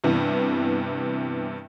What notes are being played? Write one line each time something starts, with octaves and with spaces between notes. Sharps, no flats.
G2 C3 E3 B3